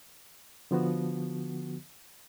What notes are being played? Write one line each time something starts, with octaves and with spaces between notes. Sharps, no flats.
D3 F3 B3 F#4